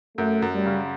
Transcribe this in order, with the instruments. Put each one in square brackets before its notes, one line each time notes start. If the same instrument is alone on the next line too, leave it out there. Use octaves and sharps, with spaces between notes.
[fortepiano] F#2 [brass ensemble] A3
[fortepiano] F#2
[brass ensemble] G3
[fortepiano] C#3